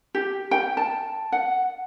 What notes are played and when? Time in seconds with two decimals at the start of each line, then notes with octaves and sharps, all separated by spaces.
0.15 G4
0.51 G5
0.77 A5
1.32 F#5